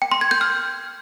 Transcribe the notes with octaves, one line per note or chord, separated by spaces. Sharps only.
G5
C6
G#6
G6
F6